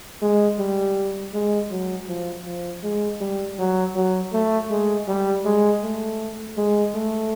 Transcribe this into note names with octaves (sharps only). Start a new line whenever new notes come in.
G#3
G3
G#3
F#3
F3
F3
G#3
G3
F#3
F#3
A3
G#3
G3
G#3
A3
G#3
A3